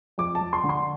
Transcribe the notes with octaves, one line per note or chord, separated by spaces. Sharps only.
F2 D6
A5
F2
C6
D3
C6